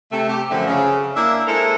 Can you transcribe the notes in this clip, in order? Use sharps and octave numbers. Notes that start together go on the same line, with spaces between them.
C3 A3
G4
F#2 D3 F3 A3 C4
C#3
A#3 D4 E4 E5
G#3 E4 A4 A#4 C5